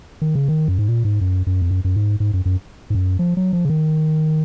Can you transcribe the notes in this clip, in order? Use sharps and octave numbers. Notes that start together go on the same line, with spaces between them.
D#3
C#3
D#3
F#2
G#2
A#2
G#2
F#2
F#2
F2
F#2
F#2
G#2
G#2
F#2
F#2
G#2
F#2
F3
F#3
F3
C#3
D#3